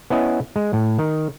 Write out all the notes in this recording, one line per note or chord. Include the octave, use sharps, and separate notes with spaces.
B3 C#4 E4 D#5
G#3
A2
D#3